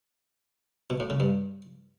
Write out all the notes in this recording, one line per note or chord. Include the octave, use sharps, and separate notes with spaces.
B2
A2
C#3
G2